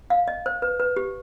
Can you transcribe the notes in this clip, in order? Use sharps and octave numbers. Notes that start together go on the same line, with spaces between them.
F5
D#5
C5
B4
B4
G4